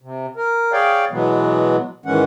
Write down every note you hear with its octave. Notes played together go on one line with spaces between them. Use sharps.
C3
A#4
G#4 C#5 D5 F5 G5
B2 E3 F#3 G#3 B3
G#2 D#3 E3 G#3 C#4 F#5